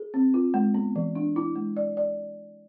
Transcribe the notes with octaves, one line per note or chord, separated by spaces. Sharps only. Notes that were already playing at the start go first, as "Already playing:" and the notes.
Already playing: G#4
C4
F4
G#3
B3
E3
D4
E4
G#3
D5
D5